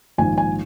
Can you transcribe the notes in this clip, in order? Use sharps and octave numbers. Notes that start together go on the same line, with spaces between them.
A#1 G#2 D#3 G#5
G#5